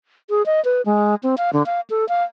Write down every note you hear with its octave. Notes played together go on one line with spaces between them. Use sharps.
G#4
D#5
B4
G#3
C4
F5
D3
F5
A4
F5